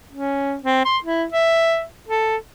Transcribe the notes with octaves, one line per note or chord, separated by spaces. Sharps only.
C#4
C4
C6
E4
E5
A4